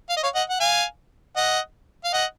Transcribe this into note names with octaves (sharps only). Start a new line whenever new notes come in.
F5
D#5
C#5 F5
D#5 F#5
F#5
F5 G#5
D#5 F#5
F5
D#5 F#5